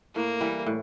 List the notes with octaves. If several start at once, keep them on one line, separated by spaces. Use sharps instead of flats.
A2 A#3
E3 G3
A2